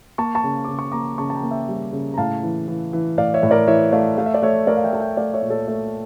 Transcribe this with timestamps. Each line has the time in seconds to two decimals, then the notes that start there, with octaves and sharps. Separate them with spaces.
0.18 A#3 A5 C#6
0.35 A5 C#6
0.44 C#3
0.64 C#3 D6
0.79 C#6
0.92 A#3 A#5 D6
1.18 C#3 A5 C#6
1.30 A5
1.35 G5 A#5
1.43 A#3
1.51 E5 G5
1.69 G3
1.93 C#3
2.14 A#5
2.18 A2 F5 A5
2.43 E3
2.68 E3
2.93 E3
3.17 A2 D5 F5
3.34 C#5 E5
3.43 A2
3.51 A#4 D5
3.68 E3 C#5 E5
3.92 A3 D5 F5
4.17 A3 F5
4.26 E5
4.34 D5
4.42 A3 C#5 E5
4.67 A3 A#4 D5
4.77 F5
4.84 E5 G5
4.93 A3 A5
5.00 E5 G5
5.17 A3 D5 F5
5.34 C#5 E5
5.42 A#2
5.50 A4 C#5
5.67 A3 C#5 E5